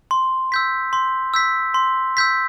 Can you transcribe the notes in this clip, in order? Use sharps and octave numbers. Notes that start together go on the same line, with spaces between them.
C6
E6 G6 B6
C6
E6 G6 B6
C6
E6 G6 B6